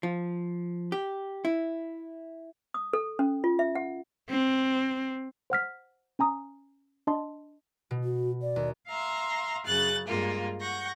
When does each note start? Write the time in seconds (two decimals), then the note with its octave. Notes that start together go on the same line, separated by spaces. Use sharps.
0.03 F3
0.92 G4
1.45 E4
2.74 D#6
2.93 A4
3.19 C#4
3.44 F4
3.59 E5
3.75 F#5
4.30 C4
5.50 C5 F#5 F6 B6
6.19 C#4 G#5 A#5 D#6
7.07 D4 D#5 A5 C6
7.91 B2
8.04 F#4
8.42 D5
8.56 D#2
8.89 E5 F5 A#5 C6
9.65 F#2 C#3 F#6 A6
10.07 G2 G#3 A#3 F4
10.60 F#5 C#6 G6 A#6